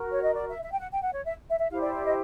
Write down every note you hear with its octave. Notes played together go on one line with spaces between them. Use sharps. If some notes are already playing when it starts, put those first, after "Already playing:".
Already playing: F#4 A#4
C#5
D#5
D5
E5
E5
G5
F#5
G5
F#5
C#5
E5
E5
E5
E4 G4 C5 F5
D5
D5
D#5